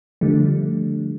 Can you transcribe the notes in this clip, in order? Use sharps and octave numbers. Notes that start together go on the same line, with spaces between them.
D3 F3 G3 A3